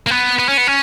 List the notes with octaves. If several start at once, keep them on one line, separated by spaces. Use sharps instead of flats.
A#3
B3
B3
C#4
B3
C#4